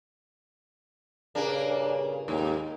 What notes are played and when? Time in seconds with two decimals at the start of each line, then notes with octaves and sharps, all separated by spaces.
1.35 G2 A#2 C#3 A#3 D4
2.28 D#2 G#2